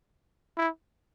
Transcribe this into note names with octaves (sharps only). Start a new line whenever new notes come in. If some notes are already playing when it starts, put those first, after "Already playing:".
E4